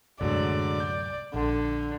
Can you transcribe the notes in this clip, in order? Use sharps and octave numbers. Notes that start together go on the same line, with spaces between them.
C2 F#2 A2 D3 F#3 G#3 D5
G6
A#1 D3